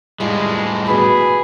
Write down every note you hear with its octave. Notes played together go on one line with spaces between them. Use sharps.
A2 G3 G#3 F4 D5 E5
B2 E3 G#4 G#5 B5